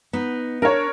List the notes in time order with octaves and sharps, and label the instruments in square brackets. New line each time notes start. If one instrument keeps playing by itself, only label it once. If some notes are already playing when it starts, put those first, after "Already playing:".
[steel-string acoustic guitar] B3 D#4
[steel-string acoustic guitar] D4 [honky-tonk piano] A#4 C#5